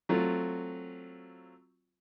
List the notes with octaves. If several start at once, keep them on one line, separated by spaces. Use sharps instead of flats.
F#3 A3 C4 F4